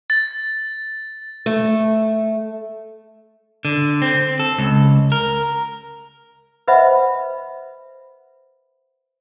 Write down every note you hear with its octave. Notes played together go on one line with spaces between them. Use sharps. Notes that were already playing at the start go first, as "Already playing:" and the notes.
A6
A3
D3
C4
A4
C#2
A#4
B4 C5 D#5 E5 F#5 B5